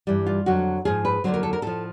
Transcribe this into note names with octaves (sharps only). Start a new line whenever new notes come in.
G2 E3 G3
F4
F2 D3 F#3 F#4
G#2 F3 G#4
B4
D#2 D3 F#3 C5
A#4
A4
A#4
A2 F3 A4